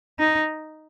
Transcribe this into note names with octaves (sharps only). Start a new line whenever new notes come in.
D#4